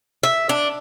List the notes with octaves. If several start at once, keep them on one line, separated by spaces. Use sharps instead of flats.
E5
D4